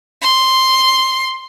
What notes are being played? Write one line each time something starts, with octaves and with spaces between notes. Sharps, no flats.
C6